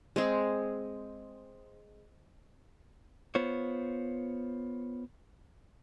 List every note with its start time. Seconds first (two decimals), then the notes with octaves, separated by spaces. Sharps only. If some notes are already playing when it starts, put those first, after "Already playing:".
0.16 G#3 C4 G#4 C5
3.35 B3 F4 C5 C#5